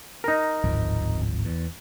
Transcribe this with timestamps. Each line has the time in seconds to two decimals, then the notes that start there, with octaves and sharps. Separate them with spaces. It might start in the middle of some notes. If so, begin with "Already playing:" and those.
0.24 D#4 A#4
0.64 D1 G#1 F2
1.45 E2